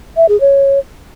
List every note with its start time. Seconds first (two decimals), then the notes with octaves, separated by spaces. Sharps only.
0.17 E5
0.29 G#4
0.41 C#5